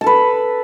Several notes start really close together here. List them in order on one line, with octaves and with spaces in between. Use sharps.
A5 A4 B4